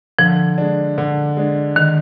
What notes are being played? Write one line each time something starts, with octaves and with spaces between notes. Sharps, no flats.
D3 F3
G#3 D4
D3
G#3 D4
D#3